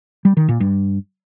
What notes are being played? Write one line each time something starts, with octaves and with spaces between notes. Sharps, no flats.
G3
D#3
A#2
G2